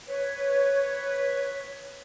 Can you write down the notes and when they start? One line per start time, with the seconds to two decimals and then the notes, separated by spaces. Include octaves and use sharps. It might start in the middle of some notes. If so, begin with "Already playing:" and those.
0.08 B4 C#5